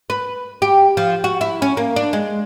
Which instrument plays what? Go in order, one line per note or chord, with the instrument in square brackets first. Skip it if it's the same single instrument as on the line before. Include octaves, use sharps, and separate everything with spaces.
[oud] B4
G4
F3
F#4
E4
C#4
A#3
D4
G#3